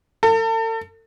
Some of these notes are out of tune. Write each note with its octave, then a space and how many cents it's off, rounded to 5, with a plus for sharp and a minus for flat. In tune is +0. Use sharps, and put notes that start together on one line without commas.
A4 +40